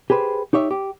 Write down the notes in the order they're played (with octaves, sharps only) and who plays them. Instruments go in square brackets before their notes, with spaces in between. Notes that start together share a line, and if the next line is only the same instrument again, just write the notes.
[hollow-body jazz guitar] G4 G#4 B4 C5
D#4 G4 C#5 E5
G4